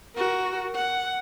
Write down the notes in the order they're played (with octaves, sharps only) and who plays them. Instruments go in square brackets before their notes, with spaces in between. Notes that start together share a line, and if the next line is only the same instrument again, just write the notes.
[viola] F#4 A#4
F#5